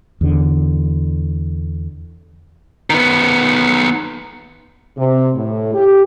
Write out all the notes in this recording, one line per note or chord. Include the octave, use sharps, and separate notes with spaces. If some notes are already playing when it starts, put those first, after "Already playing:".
E2 D3
D#3 B3
C3
A2
G4